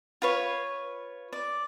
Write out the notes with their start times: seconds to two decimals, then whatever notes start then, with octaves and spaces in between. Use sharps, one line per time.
0.22 F4 B4 C#5
1.33 D5